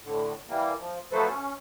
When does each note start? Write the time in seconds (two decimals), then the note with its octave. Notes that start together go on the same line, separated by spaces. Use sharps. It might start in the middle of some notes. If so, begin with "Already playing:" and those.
0.04 A2 D3
0.48 E3 G3 A#3
0.78 F3
1.12 F3 F#3 A3 A4 B4 C5
1.28 C#4